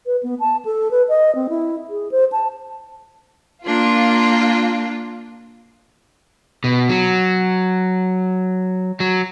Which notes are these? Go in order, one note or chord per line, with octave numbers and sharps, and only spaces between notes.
B4
B3
A5
A4
B4
D#5
C4
E4
G#4
C5
A5
A#3 D4 F4
B2
F#3
F#3